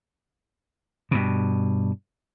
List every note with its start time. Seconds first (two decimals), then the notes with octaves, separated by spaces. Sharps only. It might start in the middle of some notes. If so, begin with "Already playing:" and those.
1.11 G2 B2